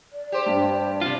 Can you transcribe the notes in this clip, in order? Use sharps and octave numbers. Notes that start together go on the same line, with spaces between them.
D5
G4 C5
G2
C3 F4